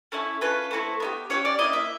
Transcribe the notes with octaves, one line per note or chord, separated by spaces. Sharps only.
A3 C#4 E4
C#4 F4 A4 B4
A3 C4 E4 A4
B3 E4 G4
C#4 E4 G4 C#5
D5
C#4 E4 D#5
A#3
E5